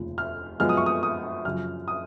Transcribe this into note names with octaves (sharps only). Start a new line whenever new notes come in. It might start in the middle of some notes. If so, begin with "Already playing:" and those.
Already playing: F1 D#2 C#3 F3
F6
F#2 F3 G#3 B3 F6
D#6
C#6
D#6
D#6
F#2 C#3 F3 F6
D#6